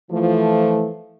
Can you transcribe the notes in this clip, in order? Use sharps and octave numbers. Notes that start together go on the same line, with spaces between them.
E3 F3 A3